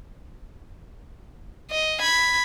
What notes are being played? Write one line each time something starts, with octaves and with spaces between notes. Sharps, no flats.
D#5
B5 G#6